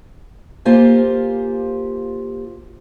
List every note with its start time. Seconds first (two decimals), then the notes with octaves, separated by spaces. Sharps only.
0.65 A#3 F4 G4 C5 G#5